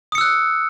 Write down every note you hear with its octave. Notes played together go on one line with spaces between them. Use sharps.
D#6 E6 F#6 C#7